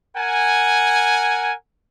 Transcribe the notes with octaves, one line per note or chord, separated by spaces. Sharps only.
A#4 F#5 G#5